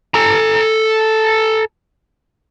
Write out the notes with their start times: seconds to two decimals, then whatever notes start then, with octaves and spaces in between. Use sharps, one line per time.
0.14 A4 A#5